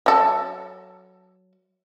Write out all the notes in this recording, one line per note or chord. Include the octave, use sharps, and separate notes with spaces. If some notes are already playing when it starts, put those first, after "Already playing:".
F#3 A4